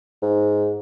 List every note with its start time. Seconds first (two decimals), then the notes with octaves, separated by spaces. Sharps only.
0.22 G#2